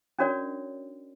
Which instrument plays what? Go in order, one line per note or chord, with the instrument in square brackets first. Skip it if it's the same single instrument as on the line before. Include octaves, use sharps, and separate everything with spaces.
[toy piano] C#4 D4 F#4 A#4 C#5 D5